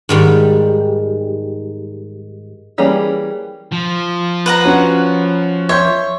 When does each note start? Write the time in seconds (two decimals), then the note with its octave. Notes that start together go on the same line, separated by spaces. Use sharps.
0.09 G#2 D#3 G3
2.78 E3 G3 A#3 C#4 G#4
3.72 F3
4.46 B4 F#5 A#5
4.64 C#4 F#4 C#5
5.69 C#5 E5 C6 G6